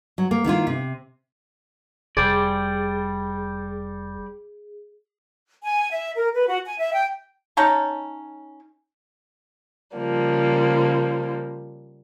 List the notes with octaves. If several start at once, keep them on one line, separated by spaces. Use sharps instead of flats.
F#3
A#3
D#3 A#3 E4 F4
C3
F1 G3 G#4 C5 D5
G#5
E5
A#4
B4
F#4
G#5
E5
G5
C#4 D#4 C#5 A5
C#3 F3 G3 A#3